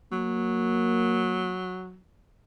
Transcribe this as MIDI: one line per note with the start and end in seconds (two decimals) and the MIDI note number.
0.12 1.98 54
0.12 1.53 58